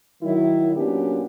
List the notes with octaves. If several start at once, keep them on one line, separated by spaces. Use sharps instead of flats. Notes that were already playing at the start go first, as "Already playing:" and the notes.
D#3 F#3 E4
A#2 F#3 B3 C#4 D4 G4